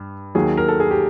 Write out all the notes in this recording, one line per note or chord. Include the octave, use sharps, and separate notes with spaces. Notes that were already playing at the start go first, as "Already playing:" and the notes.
Already playing: G2
D#2 D#3 F#3 G#4
A#4
A4
G#4
G4